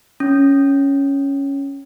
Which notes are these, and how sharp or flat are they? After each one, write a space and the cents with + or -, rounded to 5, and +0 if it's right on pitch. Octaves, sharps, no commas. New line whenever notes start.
C#4 +0